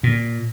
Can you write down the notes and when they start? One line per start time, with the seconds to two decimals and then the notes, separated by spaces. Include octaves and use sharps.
0.03 A#2